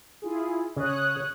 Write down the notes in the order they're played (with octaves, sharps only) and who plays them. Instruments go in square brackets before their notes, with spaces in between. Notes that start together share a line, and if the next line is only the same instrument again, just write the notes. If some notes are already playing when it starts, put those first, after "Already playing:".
[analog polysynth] E4 F4 G#4
[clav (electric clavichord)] C#3 [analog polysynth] C#5 D#6 F#6